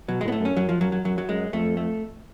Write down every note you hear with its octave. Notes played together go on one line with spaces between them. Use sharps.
B2 F#3
G#3
A2 B3
A3
F#2 C#4
F#2 F#3
F3
F#2 F#3
F#3
F#2 F#3
F#3
F#2 G#3
F2 A3
A3